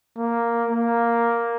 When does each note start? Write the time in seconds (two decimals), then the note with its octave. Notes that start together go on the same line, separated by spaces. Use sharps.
0.17 A#3
0.70 A#3